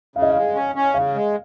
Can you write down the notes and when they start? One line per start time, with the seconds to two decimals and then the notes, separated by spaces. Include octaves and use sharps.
0.16 C#3 F5
0.22 D#5
0.30 F5
0.36 G#3
0.55 C#4
0.75 C#4
0.94 C#3 F5
1.14 G#3